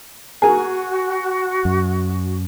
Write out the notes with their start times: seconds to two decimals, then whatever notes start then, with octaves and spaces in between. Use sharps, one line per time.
0.42 F#4 G#4 A#4 G#5
1.65 F#2